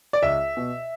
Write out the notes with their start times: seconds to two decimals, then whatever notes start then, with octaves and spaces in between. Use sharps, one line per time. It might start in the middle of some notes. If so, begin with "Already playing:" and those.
0.13 D5
0.22 C#2 E5
0.57 B2